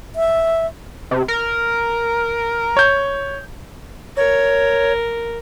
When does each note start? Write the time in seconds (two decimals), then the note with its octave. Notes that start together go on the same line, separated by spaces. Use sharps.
0.16 E5
1.11 C3
1.28 A#4
2.77 C#5 G6
4.17 A#4 C#5